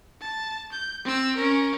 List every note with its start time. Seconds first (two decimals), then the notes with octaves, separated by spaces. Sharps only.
0.21 A5
0.72 G6
1.05 C4 E6
1.36 C#4 A#4